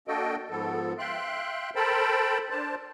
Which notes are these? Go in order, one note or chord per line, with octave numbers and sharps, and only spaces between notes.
A#3 D4 F#4 A4 D#5 G5
G#2 F3 B3 A4
E5 F5 G5 C6 F#6
A4 A#4 C5 G5 A5 B5
D4 C5 A5